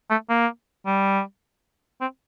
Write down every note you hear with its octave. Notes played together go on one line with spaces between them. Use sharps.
A3
A#3
G3
C4